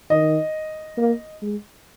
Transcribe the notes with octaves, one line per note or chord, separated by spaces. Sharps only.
D#3 D#5
A#3
G#3